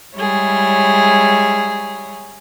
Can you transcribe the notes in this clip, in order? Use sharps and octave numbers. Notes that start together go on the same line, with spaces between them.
G3 G#3 E4 G#4 C#5